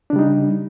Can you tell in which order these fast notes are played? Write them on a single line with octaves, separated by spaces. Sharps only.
D4 C#3 G3 D#4